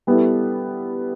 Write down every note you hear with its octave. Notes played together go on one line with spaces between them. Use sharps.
G3 B3 E4 A4